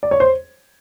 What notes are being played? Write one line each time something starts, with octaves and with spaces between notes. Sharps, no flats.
D5
C#5
C5